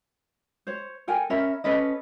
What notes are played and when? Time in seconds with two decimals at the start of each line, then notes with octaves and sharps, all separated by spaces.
0.67 C5 C#5
1.08 A4 A#4 G5 G#5
1.30 C#4 A#4 E5 B5
1.64 C#4 A4 B4 D#5